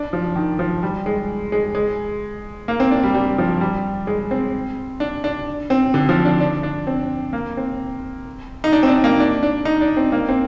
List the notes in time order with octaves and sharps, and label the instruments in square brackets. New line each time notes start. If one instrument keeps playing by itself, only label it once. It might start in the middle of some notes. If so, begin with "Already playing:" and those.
Already playing: [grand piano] D4
F3
D#3
F3
G3
G#3
G#3
G#3
A#3
C4
D4
G3
G3
F3
G3
G#3
C4
D4
D4
C4
D3
F3
D4
D4
D4
C4
A#3
C4
D#4
D4
C4
D4
A#3
D4
D4
D#4
D4
C4
A#3
C4